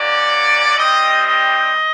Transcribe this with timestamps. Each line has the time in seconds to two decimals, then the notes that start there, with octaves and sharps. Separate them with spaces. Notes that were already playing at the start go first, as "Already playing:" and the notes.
Already playing: A#3 C#4 F#4 D5
0.76 G3 C4 E4 G4 D#5
1.25 D#5